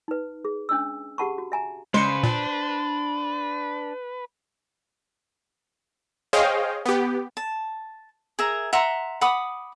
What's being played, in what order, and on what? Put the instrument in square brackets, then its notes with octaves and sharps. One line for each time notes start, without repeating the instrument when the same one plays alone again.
[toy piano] D#4 B4
G#4
C#4 D4 D#5 E6
G4 G#4 F#5 A5 B5 C#6
F#4
E5 G#5 A#5
[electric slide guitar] C#3 [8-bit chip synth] G#3 C#7 [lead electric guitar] B4 [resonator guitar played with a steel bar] C5
[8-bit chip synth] A#2 [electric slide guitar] D4
[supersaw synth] G#4 C5 C#5 D#5 F5 G5
B3 G4
[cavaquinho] A5
G#4 A#4 E5 A#5
E5 F#5 A#5 C6
F#5 B5 D6 D#6